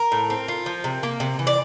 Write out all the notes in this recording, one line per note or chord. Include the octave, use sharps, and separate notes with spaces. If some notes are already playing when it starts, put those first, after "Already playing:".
Already playing: A#4
A2
C4
F4
F3
C3
A#3
C3
E3
D5